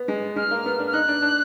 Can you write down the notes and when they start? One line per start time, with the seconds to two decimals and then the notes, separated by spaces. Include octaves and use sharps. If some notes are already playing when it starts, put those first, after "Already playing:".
Already playing: B3
0.08 G#3
0.36 G#3 F6
0.51 A#3
0.65 B3
0.79 D4
0.87 F6
0.93 D#4 F#6
1.08 D4
1.22 D4